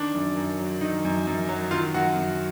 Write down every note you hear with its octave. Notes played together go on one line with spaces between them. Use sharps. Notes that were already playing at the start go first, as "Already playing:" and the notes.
Already playing: D#3 D4
F#2
F#2
F#3
D#3 D#4
F#2
F#2
F#3
D#3 F4
F#2 F#4
F#2